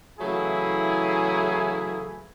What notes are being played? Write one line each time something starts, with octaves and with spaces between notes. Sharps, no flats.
C#3 E3 F#3 A3 E4 G#4